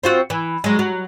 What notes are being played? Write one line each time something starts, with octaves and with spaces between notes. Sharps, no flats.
C4 F4 F#4
E3
F#3 G#3
F#3